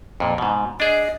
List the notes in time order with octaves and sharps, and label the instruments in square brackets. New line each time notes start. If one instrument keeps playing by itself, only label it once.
[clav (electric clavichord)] F2 A#2
G#2 B2
[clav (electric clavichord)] D4 G#4 [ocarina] D#5